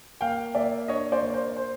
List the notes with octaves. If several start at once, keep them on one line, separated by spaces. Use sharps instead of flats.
A#3 F5 G5
A#3 D5 E5
D4 C#5 D#5
C5 D5
A#3
C5
C5